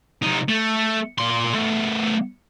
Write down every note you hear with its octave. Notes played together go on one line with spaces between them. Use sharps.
C3 D#4
A3
A#2 C6
A3 B3